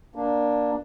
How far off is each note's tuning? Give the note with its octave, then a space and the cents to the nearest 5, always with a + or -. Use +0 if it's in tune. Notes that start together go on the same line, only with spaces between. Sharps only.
A#3 +15 D4 +0